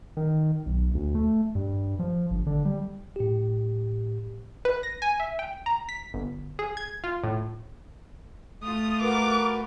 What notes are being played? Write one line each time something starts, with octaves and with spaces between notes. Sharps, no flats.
D#3
B1
D2
A3
G2
F3
G1
D3
G3
A2 G4
B4
A#6
G#5
E5
G5
A#5
B6
G1
G#4
G#6
F4
A2
A3 F4 D#6
F#4 A#4 B4 D6